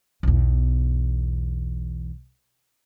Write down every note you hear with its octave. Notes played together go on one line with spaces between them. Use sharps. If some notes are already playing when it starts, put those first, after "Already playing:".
B1 E2